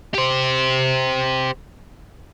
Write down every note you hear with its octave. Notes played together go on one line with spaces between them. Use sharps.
G4 C5